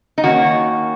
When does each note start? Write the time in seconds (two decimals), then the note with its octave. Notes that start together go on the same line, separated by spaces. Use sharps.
0.18 D#4
0.23 D#3 A#3 C#4 F#4